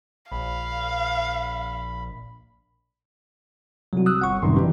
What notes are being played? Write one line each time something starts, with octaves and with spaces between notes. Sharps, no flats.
A#1 F5 B5
C2 F#3 F#4
D#6 E6 F#6
G1 F#5 C#6
C2 F#2 A2 C3 D#3 C6
E3 D4 G4